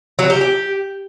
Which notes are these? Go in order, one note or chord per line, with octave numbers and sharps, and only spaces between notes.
F#3
G4
G4